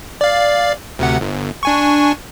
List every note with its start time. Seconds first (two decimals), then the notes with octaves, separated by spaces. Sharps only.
0.21 D5 F5
0.99 D2 C3 F#5
1.21 G1
1.63 D4 G#5 C#6